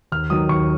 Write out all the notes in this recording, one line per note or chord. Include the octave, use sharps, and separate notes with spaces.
D#2 F6
D#3 F#3 D#6
D#2 C#6